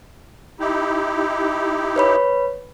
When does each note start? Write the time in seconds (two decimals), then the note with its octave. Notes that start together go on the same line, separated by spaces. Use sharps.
0.60 D#4 E4 G4
1.96 B4 C#5 B5